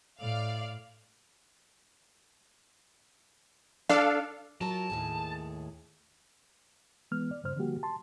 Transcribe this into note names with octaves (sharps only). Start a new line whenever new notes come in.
A2 D5 F5
D4 A4 F5
F#3 F4 A#4 A5
D#2 A2 G#4
E3 G#3 B3 F6
D5
G2 C#3 C5 F6
D3 F3 G3 A#3 F#4 G4
A5 C6